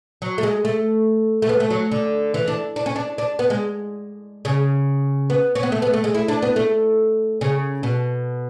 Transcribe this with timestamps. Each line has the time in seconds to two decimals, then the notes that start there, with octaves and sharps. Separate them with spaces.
0.22 F#3
0.38 A3
0.43 G#3
0.65 A3
1.42 A3
1.49 B3
1.60 A3
1.70 F#3
1.91 D3
2.34 E3
2.47 D4
2.76 D4
2.86 C#4
2.96 D4
3.18 D4
3.39 B3
3.50 G#3
4.45 C#3
5.30 B3
5.55 C#4
5.63 B3
5.72 A3
5.82 B3
5.93 A3
6.04 G#3
6.15 E4
6.28 D4
6.42 B3
6.56 A3
7.41 C#3
7.83 B2